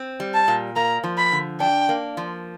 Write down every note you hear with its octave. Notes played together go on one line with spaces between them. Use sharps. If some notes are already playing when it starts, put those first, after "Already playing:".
Already playing: C4
G3
A5
A#2
A#3 A#5
F3
B5
D3
D4 G5
A#3
F3